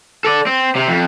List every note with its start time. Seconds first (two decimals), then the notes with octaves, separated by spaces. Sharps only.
0.24 A4 D5
0.46 C4
0.75 C3
0.88 F2